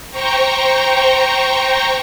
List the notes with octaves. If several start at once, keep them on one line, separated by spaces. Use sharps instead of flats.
C5 G5 A#5 C#6